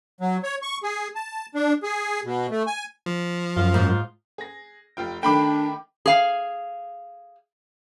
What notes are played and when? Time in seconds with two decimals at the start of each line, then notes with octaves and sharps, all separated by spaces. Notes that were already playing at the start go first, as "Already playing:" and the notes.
0.21 F#3
0.43 C#5
0.62 C#6
0.83 G#4
1.15 A5
1.55 D4
1.83 G#4
2.25 B2
2.51 A3
2.67 G#5
3.06 F3
3.57 F#2 F4
3.74 G#2
3.89 F4
4.38 G#4 A#6
4.97 F1 F4 G5
5.23 D#3 A3 D4 G5 B5 D6
6.06 G#4 F5